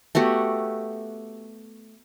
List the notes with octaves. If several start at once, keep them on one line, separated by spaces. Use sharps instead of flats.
A3 B3 F#4 G4